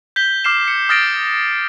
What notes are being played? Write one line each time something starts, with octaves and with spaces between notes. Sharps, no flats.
G6 B6 G7
D6 F6 C7 E7
C#7
D#6 F6 A6 A#6 C7 D7